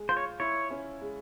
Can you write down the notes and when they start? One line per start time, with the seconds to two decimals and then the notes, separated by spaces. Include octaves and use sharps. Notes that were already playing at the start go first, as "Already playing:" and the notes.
Already playing: G#3
0.09 F4 C5
0.17 C#5
0.40 E4 C#5
0.70 C#4
1.01 G#3